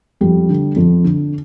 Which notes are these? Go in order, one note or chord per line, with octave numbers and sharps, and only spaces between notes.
F2 G3
D3
F2
D3